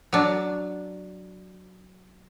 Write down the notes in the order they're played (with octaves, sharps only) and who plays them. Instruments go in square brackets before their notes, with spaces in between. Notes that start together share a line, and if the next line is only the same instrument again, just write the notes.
[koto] F#3 D4